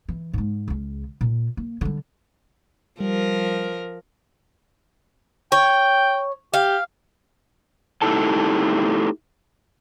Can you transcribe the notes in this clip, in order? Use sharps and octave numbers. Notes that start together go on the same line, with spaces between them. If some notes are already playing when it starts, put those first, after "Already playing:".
E3
G#2 G#3
C#2 C#3
A#2
A#3
D3 G3
F3 G3 A#4
C#5 G5
G4 F5
A3 D#4 E4 G4 A4 A5